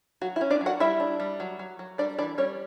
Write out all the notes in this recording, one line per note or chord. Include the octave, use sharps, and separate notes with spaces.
F#3 F#4
E4
C#4
D4 D5
F#3
F#4 F#5
G3 E4 E5
D4
G3
F#3
F#3
F#3
G3 D4 D5
E3 D4 D5
G3 C#4 C#5